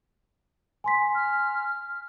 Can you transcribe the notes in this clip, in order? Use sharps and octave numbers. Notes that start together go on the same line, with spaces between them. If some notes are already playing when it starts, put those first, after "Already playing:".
G#5 C6 B6
F6